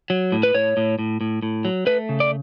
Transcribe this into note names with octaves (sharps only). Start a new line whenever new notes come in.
F#3
A2
B4
A2 C#5
A2
A2
A2
A2
F#3
A3 B4
C#3
D5